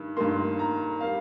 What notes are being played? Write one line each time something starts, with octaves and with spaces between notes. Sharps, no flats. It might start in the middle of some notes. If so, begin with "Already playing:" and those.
Already playing: G2 D#3
G2 D#3 A#3 C6
A#5
G3 A#3 F5